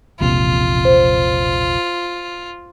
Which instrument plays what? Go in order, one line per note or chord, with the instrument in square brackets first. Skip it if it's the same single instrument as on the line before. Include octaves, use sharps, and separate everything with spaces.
[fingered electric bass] E1 A#1 C3 [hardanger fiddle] F4
[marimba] C5